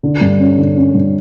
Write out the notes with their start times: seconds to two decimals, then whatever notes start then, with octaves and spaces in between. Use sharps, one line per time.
0.03 D3
0.21 G2
0.40 C#4
0.58 D3
0.76 C#4
0.94 G2